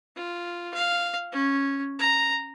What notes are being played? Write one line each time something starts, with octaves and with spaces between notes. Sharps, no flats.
F4
F5
C#4
A#5